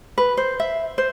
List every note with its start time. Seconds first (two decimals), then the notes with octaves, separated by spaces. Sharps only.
0.18 B4
0.37 C5
0.60 E5
0.98 C5